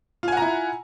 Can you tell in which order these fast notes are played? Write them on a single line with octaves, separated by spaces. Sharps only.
F4 G#5 F#5 A#5 E4